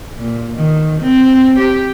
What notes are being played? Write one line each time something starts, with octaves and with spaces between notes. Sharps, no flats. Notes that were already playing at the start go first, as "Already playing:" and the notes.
A#2
D#3
C4
G4